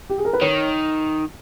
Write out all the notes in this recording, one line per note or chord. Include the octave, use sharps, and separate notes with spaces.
G4
G#4
A#4
B4
D#3 C#5